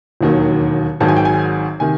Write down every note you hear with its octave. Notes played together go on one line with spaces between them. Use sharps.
E1 D#2 D#3 F#3
G#1 G#2 D#3 F#3 A5
G#5
G5
G#5
C3 D#3 G#5